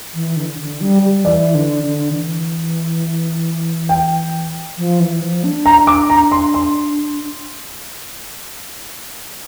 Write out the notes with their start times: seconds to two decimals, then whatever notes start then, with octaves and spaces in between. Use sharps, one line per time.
0.14 E3
0.37 D3
0.58 D3
0.81 G3
1.03 G3
1.24 E3 D5
1.54 D3
1.84 D3
2.13 E3
3.89 G5
4.78 F3
5.00 E3
5.22 F3
5.44 D4
5.66 A#5
5.87 D6
6.10 A#5
6.32 C6
6.54 C6